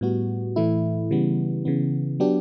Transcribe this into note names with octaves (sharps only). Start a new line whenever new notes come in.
A2 G3 B3 F#4
A2 E3 A3 E4
C#3 E3 G3 B3
C#3 E3 B3
F#3 B3 D4 G4